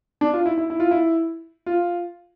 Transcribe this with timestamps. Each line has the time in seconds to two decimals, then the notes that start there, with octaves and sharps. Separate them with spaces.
0.21 D4
0.33 F4
0.46 E4
0.58 E4
0.70 E4
0.80 F4
0.91 E4
1.66 F4